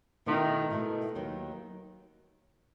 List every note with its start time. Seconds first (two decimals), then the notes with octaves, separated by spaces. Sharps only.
0.26 B2 D#3 A3 E4
0.70 B2 A3 E4
1.15 D#2 D#3 F#3